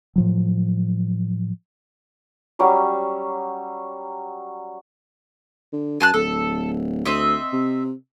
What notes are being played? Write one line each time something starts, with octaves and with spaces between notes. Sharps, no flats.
A2 F3 F#3
F#3 G3 C#4 D6
D3
F#2 G#5 A5 F#6
D1 A4
D2 C4 D#5 E5
C3